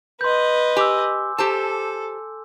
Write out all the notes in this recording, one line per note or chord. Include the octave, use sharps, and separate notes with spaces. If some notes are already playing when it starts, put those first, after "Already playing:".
B4 D#5 C6 G6
G4 G#5 D6 E6
G4 A4 C5 A5